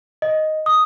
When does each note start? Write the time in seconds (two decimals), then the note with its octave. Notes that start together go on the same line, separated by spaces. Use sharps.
0.22 D#5
0.66 D#6